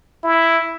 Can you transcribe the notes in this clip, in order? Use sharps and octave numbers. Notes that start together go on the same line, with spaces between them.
E4